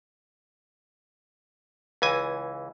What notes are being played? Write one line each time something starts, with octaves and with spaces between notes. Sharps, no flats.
C#2 E3 G#5